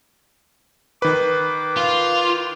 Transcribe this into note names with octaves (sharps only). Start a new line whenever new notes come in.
D#3 B4 D6
F4